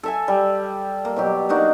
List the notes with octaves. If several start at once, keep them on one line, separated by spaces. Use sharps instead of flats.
A4 E5 G#5
G3
A#3
B2 F#3 G4
A#3 D4 D#4 F#4